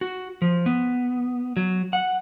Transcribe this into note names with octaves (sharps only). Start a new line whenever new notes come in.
F#4
F3
B3
F#3
F#5